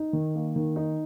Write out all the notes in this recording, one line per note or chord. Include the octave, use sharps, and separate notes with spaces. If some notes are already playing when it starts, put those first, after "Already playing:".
Already playing: D#4
D#3
A#3
D#3
D#4